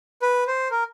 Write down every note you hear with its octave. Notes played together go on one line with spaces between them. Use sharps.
B4
C5
A#4